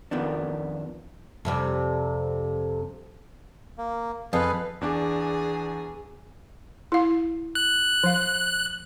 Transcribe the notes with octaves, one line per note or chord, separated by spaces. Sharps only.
F2 D#3 B3 D4
F2 C3 G3
A#3
F2 G#4 A4 B4 F5
E2 D4 G#4 D6
E4 F5
F#6
F3 F5